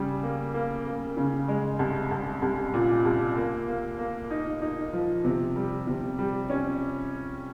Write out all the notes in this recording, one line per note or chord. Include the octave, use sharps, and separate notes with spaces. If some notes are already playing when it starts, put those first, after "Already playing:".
Already playing: C#3 G3
A#3
A#3
A#3
C#3
G#3
C2
C2
C2
A#2
C2
A#3
A#3
A#3
D#4
D#4
F3
C3
G3
C3
G3
C#4